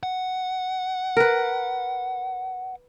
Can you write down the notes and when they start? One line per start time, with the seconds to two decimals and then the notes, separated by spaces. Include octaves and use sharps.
0.03 F#5
1.17 A#4 B4